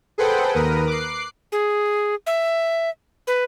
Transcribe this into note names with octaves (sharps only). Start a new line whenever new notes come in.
G#4 A4 B4 C5 F#5 G5
D#2 A#4 B4 D#6
D6 F#6 C7
G#4
E5
B4